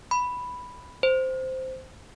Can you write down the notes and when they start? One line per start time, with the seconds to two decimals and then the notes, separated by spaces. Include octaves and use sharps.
0.11 B5
1.03 C5